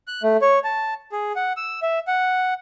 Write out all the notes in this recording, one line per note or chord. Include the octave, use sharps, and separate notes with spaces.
F#6
A3
C#5
A5
G#4
F#5
E6
E5
F#5